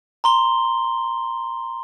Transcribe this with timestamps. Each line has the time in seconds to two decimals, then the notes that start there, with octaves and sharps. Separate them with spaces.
0.24 A#5 C6 G7